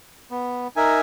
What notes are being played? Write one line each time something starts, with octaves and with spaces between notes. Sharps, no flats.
B3
D#4 A#4 E5 G#5